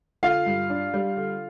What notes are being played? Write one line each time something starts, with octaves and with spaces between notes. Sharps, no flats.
D3 F4 F5
G2
D4
G3
D3